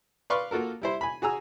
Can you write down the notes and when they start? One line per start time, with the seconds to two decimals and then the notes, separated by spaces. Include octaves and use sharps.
0.30 B4 D5 F5 C6 C#6
0.51 A#3 F4 F#4 A4 A#4
0.82 G3 E4 C5
1.01 G#5 B5
1.22 F#4 G#4 G#5 A#5 E6